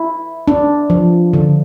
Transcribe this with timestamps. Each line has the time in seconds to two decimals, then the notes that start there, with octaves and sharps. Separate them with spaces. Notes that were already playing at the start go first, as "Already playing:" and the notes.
Already playing: E4
0.48 D4
0.90 F3
1.33 D3